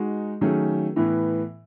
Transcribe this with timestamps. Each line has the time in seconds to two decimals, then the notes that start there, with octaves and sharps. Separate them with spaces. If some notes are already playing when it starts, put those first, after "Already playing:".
Already playing: G#3 D#4 F#4
0.41 D#3 F#3 A3 C#4 G#4
0.96 A2 E3 B3